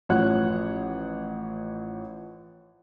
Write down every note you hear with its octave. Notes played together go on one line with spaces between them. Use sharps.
A1 F3 C#5 F#5 F#6